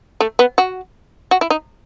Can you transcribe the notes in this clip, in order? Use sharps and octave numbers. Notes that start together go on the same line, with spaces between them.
A3
B3
F#4
F#4
E4
D#4